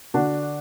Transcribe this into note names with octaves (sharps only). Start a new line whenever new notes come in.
D3 D4 F#4